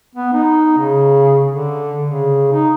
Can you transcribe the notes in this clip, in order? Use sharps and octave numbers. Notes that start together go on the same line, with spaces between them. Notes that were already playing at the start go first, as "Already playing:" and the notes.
B3
D#4
C#3
D3
C#3
D#4